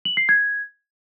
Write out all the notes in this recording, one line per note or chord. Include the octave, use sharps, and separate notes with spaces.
F#7
C7
G#6